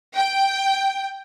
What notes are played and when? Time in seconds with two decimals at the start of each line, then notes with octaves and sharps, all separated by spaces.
0.16 G5